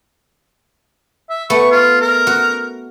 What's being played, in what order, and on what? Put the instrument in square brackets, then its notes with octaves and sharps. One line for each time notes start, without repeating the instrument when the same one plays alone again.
[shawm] E5
[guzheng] A3 B3 [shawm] C#6
[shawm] F4
A#4
[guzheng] F#4